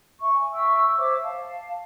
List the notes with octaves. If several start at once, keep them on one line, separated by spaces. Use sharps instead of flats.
E5 C#6
G#5
E5 G5 C#6 E6
C5 C#5 E5 D6
F5 A5